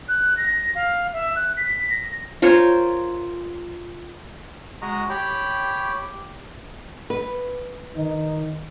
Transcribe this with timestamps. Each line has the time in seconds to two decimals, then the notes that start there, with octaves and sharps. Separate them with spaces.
0.09 F#6
0.37 A#6
0.75 F5
1.13 E5
1.36 F#6
1.57 B6
1.90 A#6
2.42 F4 A#4 C5 C#5
4.82 G#3 F#4 D#5 A#5
5.10 G4 C#5 G5 B5
7.10 B4
7.96 D#3 D#4